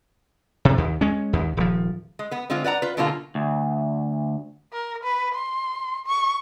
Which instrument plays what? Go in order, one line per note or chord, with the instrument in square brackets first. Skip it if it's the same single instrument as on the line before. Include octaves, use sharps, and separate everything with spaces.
[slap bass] C3
D#2
G#3 C#4
D#2
D#1 F3
[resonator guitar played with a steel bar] G#3
B3 B4
D3 G#3 C4 F4
B4 D5 F#5 A#5
F4 B4
B2 D3 F#3 A#3 F4 G#4
[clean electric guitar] D2
[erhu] A#4
B4
C6
C#6